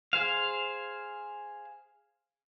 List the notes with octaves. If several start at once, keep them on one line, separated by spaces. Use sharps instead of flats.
G#4 C5 F5